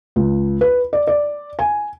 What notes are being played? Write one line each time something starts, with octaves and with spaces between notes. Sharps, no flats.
C#2
B4
D5
D5
G#5